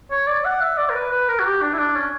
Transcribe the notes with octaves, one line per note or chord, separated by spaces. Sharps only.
C#5
D5
F#5
E5
D5
A#4
B4
B4
A#4
F#4
G4
D4
E4
D4
C#4